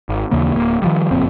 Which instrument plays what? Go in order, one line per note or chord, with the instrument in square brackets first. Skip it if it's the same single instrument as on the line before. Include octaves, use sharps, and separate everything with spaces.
[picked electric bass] G#1
D#2 C#3 E3 A#3
D1 A#3
D#3 F3 G3
F#1 F2 A#2 C4